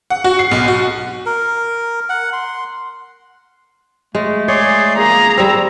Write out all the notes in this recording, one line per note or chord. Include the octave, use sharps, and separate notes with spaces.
F#5
F#4
C7
B1
F#4
A#4
F#5
C6
G#3 A3
G#4 C#5 D5 C6
A#3 G#4 A#5
G3 C4 E6